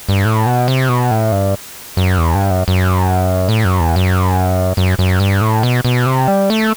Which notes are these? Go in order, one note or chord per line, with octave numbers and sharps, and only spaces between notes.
G2
A2
B2
C3
B2
A2
G2
F#2
E2
G2
F#2
F#2
A2
F#2
E2
F#2
F#2
F#2
G2
A2
B2
B2
C3
G3
A3